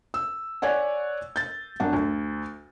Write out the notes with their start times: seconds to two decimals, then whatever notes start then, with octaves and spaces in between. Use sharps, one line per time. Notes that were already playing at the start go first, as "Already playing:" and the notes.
0.14 E6
0.62 C#5 D5 F#5 G#5
1.36 G6 A6
1.80 F#2 D4 F#5
1.93 D2